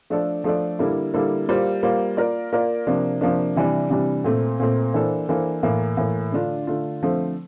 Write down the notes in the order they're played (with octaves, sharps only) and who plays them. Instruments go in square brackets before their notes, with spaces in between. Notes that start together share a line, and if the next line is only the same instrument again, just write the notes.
[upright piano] F3 A3 D4 A4 D5
F3 A3 D4 A4 D5
D3 G3 A#3 E4 A4
D3 G3 A#3 E4 A4
G3 A#3 F4 C5
G3 A#3 F4 C5
A#3 F4 A#4 D5
A#3 F4 A#4 D5
C3 F3 A#3 D4
C3 F3 A#3 D4
C3 E3 G3 D4
C3 E3 G3 D4
A#2 A3 C4
A#2 A3 C4
E3 A#3 D4 A4 C5
E3 A#3 D4 A4 C5
A2 E3 A#3
A2 E3 A#3
D3 A3 D4 F4
D3 A3 D4 F4
D3 F3 A3 C4